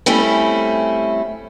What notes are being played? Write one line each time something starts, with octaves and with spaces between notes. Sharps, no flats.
G3 A3 C4 C#4 E4